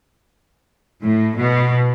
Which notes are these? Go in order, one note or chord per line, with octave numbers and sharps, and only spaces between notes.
A2
B2